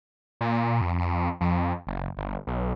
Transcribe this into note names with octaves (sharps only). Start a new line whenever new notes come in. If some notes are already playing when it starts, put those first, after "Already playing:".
A#2
F2
F2
F2
F#1
G1
B1